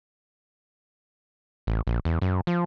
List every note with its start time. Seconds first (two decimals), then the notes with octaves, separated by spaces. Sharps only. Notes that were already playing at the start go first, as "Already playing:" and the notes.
1.67 A1
1.87 A#1
2.05 E2
2.22 F#2
2.47 F3